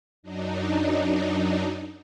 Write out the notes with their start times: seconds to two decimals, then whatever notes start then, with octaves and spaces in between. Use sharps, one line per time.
0.23 F#2 F#3 D4 D#4